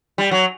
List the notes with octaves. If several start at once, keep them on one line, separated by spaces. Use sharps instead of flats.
G3
F#3